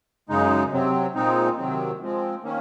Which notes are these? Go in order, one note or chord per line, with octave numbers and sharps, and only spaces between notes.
F#2 C#3 G#3 D#4
C3 F#3 C4
A#2 G#3 C4 D#4
C3 D#3 F#3 C4
F3 G#3 C4
D#3 A#3 C#4